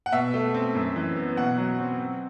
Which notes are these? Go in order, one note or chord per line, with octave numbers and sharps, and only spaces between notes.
F#5
B2 E5
A3
C4
F#2
E3
B3
B2 F#5
F#3
C4
C4